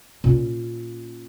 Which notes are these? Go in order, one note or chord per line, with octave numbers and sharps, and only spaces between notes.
A#2 C#4